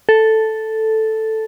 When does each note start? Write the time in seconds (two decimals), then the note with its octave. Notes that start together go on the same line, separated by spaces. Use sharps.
0.09 A4